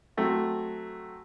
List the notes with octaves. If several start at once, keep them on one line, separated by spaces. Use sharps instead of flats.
F#3 A3 C4